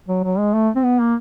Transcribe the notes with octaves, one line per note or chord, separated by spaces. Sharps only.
F#3
F#3
G#3
A3
C4
B3
A#3